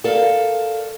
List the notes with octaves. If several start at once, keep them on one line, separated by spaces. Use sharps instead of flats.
A4 A#4 D5 F5